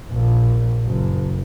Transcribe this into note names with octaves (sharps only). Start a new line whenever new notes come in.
A#1
F#1